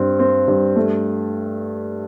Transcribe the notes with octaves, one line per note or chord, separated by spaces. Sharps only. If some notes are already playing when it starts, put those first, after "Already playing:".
Already playing: G2 C4
C4
G2
A3